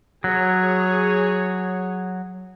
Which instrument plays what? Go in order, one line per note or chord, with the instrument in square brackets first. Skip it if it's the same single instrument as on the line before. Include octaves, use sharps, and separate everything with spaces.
[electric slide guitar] F#3 [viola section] G#4 C#5